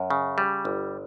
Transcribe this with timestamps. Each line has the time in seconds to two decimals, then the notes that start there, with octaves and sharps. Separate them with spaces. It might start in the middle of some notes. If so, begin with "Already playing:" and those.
Already playing: F#2
0.10 C#3
0.38 G3
0.65 G1